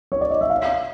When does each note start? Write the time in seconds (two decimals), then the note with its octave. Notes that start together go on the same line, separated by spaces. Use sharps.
0.12 C#5
0.21 D5
0.30 D#5
0.41 E5
0.50 F5